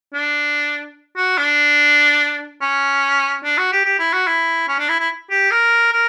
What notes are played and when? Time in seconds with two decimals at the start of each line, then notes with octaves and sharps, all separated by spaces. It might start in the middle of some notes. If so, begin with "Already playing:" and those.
0.13 D4
1.17 F#4
1.37 D4
2.62 C#4
3.44 D4
3.57 F#4
3.72 G4
3.85 G4
3.99 E4
4.13 F#4
4.27 E4
4.68 C#4
4.79 D4
4.89 E4
4.99 E4
5.31 G4
5.51 A#4
5.92 A#4